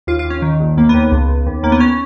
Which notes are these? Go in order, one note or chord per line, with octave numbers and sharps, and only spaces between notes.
D#2 F4
F4
D#2
C#4
D#3
A#1
D#2 A#3
B3
D#2
B3
C#2
C#2
D#2
D#2 A#3
B3
C#4